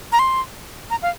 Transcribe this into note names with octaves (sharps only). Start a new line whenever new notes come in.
A#5
C6
A#5
F5